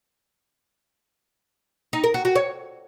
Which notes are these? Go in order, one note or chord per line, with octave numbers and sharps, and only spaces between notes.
D#4
A#4
F#4
F#4
C#5